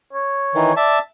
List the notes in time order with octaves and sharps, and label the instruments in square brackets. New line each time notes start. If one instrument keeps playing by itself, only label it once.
[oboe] C#5
[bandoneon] D#3 E3
[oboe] D5 [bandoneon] E5 A5